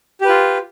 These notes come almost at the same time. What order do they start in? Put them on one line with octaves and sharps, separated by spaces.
G4 B4 F4